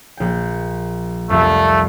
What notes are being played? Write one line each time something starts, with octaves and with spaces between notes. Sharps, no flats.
A#1 G5
C2 F2 A3